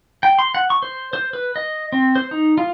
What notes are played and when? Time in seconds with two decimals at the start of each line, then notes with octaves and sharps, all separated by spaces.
0.23 G5
0.39 C6
0.55 F#5
0.70 C#6
0.83 C5
1.13 C5
1.33 B4
1.56 D#5
1.92 C4
2.16 C5
2.31 D#4
2.58 F4